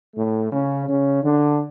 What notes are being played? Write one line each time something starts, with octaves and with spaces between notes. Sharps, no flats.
A2 A3
C#3 C#4
C#3 C#4
D3 D4